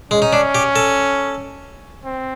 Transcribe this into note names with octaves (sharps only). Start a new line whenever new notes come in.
G#3 C#4
D#4
D4
G4
A4
C4